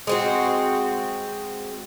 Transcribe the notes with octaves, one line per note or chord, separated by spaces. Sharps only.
G#3 C4 F#4